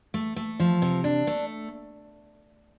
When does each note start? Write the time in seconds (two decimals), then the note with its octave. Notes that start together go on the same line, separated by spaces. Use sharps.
0.14 A3
0.36 A3
0.60 F3
0.82 C3
1.04 D4
1.27 A3